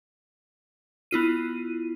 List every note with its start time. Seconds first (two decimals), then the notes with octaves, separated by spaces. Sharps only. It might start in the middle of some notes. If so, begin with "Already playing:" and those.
1.11 B3 E4 F4 D#7